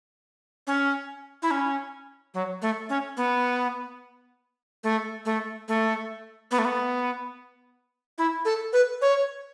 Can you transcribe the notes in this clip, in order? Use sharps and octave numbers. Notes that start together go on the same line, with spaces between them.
C#4
E4
C#4
F#3
A3
C#4
B3
A3
A3
A3
B3
A3
B3
E4
A4
B4
C#5